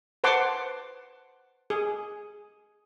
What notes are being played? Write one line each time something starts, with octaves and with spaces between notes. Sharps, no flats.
B4 C5 F#5 A5 C6 D6
G#4